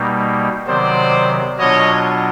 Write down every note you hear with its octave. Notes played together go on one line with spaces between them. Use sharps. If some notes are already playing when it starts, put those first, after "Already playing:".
Already playing: B2 G3 A#3 D#4
C3 D#3 F#3 B3 C5 D5
B2 F#3 B3 D4 F4 C#5 D#5